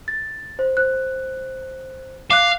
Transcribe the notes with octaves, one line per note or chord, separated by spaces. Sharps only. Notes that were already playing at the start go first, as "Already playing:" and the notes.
A6
C5
C5 F#6
F5 D6 F#6